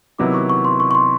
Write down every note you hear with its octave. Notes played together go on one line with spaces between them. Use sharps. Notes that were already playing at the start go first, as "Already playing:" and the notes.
C3 D#3 F#3 B3 E4 D6
C#6
C#6
C6
C#6
C#6
C6